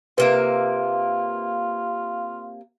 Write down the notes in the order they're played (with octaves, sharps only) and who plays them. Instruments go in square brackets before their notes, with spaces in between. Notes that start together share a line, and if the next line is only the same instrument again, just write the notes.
[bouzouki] C3 A#3 E5 [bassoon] F4 [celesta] B4